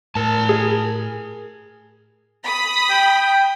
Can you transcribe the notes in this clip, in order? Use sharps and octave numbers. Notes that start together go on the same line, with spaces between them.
A2 A#4 A5
G#4
B5 D#6
G5
G5